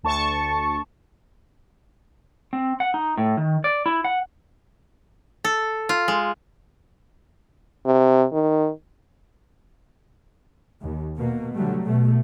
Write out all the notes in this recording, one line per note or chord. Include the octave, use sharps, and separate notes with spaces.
D2 A5 C#6
C4
F#5
D#4
A2
D#3
D5
E4
F#5
A4
F4
G#3
C3
D#3
D#2
B2 A#3
D3 F#3 G3 A3
B2 A3